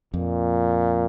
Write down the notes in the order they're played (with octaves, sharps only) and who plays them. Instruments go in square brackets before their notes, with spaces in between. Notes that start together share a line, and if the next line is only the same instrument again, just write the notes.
[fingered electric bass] F2 [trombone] A#2